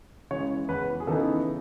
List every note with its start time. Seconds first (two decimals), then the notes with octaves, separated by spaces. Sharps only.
0.31 C#3 E3 G#3 C#5
0.69 E2 B4
1.00 G#4
1.07 C#3 E3 B3 D#4 A4